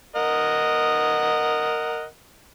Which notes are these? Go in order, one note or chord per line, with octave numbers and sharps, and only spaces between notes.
A#4 D#5 F#5